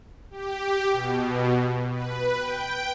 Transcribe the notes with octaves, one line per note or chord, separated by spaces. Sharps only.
G4
B2
B4
G5